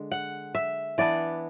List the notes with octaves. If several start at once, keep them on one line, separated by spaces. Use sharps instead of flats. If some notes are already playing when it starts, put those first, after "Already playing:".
Already playing: D3 G#3
F#5
E5
E3 B3 D4 D5